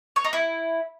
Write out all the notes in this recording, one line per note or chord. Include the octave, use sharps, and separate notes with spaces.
C#5
D#4
E4